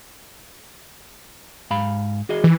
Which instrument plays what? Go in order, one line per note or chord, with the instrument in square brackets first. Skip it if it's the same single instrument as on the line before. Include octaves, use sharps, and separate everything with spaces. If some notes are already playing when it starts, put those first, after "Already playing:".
[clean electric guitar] G#2 F5 B5
F#4 G#4 D#5
[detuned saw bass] E3